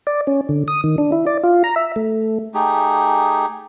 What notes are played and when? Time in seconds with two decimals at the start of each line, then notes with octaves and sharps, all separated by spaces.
0.07 D5
0.27 C#4
0.49 D3
0.68 D#6
0.84 D#3
0.98 D4
1.12 E4
1.26 D5
1.44 F4
1.64 A#5
1.76 E5
1.96 A3
2.54 A3 D#4 G4 G#4